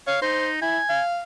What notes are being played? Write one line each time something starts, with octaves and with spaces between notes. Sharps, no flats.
C#5 F5
D#4 C5
E4 G#5
F5